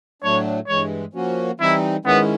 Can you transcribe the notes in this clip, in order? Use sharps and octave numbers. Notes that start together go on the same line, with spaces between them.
A2 F#3 A3 D4 C#5
G2 E3 G#3 C#5
F3 A#3 C#4 F#4
E3 G3 C4 D#4 E4
G#2 D#3 G#3 B3 C#4 E4